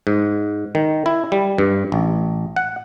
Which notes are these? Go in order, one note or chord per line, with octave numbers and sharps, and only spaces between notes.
G#2
D#3
E4
G3
G2
A1
F#5